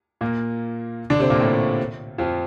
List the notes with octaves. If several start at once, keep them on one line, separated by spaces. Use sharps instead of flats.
A#2 A#3
D3 D4
C3 C4
A#2 A#3
A2 A3
F2 F3